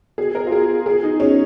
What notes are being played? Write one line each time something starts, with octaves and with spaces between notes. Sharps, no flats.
G#4
A#4
F4
G#4
G#4
D#4
C#4